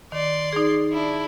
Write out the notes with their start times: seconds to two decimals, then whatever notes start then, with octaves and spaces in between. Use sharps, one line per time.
0.12 D#3 D5 C6
0.53 D#4 G#4
0.92 D4 E4